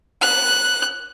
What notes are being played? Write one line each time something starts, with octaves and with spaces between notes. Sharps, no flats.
F#6